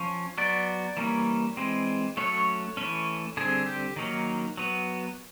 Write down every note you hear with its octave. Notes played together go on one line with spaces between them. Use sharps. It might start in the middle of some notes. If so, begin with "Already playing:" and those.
Already playing: F3 C#4
F#3 B3 D5
E3 G3 A#3 C#4
E3 G#3 C4
F#3 A3 C#4 C#5
E3 A3 C#4
D3 G3 C4 G#4
G4
D#3 F#3 A#3 C#4
F#3 B3